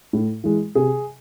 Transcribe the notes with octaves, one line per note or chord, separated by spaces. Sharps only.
A2
E3 G#3
C3 G#4